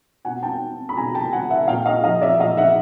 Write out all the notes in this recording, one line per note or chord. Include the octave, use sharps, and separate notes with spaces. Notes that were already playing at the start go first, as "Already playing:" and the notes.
B2 F#5 G#5
G5 A5
B5
B2 G#5 A#5
G5 A5
F#5 G#5
E5 F#5
A#2 F5 G5
D#5 F5
F3 D#5 F5
D5 E5
A#2 D#5 F5
E5 F#5